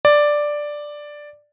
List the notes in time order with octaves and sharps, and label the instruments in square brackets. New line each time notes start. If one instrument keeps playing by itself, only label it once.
[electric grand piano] D5